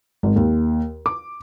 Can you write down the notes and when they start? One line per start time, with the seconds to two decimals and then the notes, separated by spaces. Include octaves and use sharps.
0.23 G#1
0.36 D#2
1.06 D6